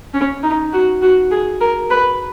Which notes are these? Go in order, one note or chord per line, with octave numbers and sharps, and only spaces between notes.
C#4
D#4
F#4
F#4
G#4
A#4
B4